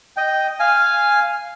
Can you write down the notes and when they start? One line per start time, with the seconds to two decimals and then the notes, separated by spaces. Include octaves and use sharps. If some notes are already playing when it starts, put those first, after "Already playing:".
0.17 D#5 G5
0.60 F5 G#5